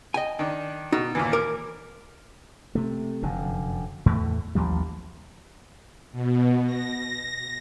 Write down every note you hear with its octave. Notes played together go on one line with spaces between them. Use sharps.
D#5 G5 G#5
D#3 D4
B2 D#4
D#2 A#2 E3
A#4 D6
C3 A3
F1 F#2 D3
E2 A2 A3
A1 D#2 F3 G3
B2
A#6